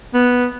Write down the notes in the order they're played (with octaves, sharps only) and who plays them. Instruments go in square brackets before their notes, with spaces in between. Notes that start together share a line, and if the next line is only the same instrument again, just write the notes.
[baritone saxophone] B3